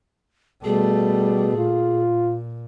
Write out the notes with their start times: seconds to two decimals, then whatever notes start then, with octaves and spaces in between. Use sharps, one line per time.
0.64 B2 G3 A3 G#4
1.58 A#2 F4